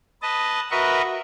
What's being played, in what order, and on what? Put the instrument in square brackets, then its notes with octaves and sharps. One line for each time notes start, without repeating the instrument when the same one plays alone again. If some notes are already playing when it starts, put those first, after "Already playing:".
[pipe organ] B4 D#5 A5
F#4 A#4 B4 D#5 E5 C#6